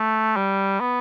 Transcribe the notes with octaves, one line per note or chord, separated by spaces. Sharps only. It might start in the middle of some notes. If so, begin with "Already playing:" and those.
Already playing: A3
G3
B3